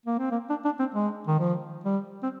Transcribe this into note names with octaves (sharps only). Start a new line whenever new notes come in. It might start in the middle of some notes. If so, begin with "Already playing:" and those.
A#3
C4
A#3
D4
D4
C4
G#3
D#3
F3
G3
C4